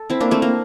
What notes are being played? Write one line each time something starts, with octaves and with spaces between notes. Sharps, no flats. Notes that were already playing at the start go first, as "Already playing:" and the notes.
Already playing: A4
C4 E4
A#3 D4
A3 C4
A#3